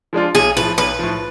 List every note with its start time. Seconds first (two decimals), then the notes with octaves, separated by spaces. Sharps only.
0.13 F3 G#3 D4 F4
0.35 B1 G#4
0.57 A2 F3 B4
0.78 B1 B4
0.99 A2 F3